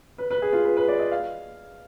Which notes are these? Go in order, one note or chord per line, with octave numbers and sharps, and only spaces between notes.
B4
B4
G#4
F4
B4
B4
D5
D#5
F5